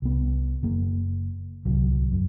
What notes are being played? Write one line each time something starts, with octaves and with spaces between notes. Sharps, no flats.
C2 B3
F#1 A#3
D1 C2 F#3
F#2